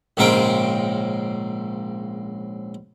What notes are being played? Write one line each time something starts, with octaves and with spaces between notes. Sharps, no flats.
A#1 G#2 C#3 C4 A#4 G5